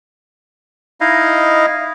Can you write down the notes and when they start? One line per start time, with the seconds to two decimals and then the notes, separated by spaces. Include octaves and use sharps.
1.01 D#4 E4 D#5 F5